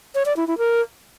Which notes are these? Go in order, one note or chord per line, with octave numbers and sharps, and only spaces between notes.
C#5
D5
E4
E4
A#4